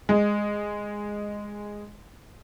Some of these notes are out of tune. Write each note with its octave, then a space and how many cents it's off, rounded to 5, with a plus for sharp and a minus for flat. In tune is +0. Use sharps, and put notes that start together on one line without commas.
G#3 -5